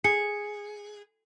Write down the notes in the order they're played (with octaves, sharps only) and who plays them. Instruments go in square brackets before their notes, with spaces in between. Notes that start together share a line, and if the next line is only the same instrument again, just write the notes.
[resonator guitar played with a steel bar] G#4 [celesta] C#7